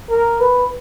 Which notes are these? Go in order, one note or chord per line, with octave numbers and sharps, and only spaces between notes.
A#4
B4